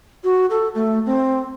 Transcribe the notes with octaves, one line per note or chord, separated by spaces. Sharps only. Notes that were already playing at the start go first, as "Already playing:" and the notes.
F#4
A4
A3
C4